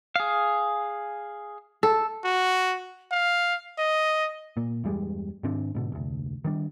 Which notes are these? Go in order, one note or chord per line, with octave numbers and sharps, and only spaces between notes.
G#4 F5
A4
F#4
F5
D#5
A#2 A#3
E2 G2 G3 G#3
G#2 D#3 C4 D4
G#2 B2 D3
F1 D2
D#3 G3 D4